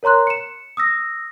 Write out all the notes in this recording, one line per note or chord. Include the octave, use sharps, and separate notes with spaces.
A#4 C#5 A#5 C6 F#6
C#7 E7
D#6 E6 A#6